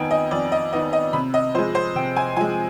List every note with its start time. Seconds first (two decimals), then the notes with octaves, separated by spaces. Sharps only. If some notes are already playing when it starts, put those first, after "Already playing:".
Already playing: F2 D#3 B3 D#4 G5 G#5
0.11 D#5
0.31 F2 D5
0.52 D#5
0.72 D#3 B3 D#4 D#5
0.93 D#5
1.13 C3 B5
1.34 D#5
1.55 F3 C5
1.59 G#3
1.75 C5
1.95 C3 G5
2.16 G#5
2.36 F3 G#5
2.41 G#3